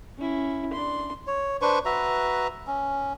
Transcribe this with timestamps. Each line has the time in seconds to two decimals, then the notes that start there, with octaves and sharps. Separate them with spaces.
0.18 C#4 E4
0.73 D4 C6
1.27 C#5
1.62 D4 B4 C5 C#6
1.85 F#4 B4 E5 A#5
2.67 C#4